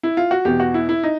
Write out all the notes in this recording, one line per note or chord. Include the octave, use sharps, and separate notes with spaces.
E4
F4
F#4
E2 B2 G4
F#4
E4
E4
D#4